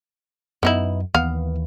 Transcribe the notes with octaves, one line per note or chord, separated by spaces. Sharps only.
F#2 B3 D#4 E4
D#2 E3 B3 F5